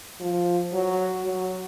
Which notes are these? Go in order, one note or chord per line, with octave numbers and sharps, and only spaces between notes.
F3
F#3
F#3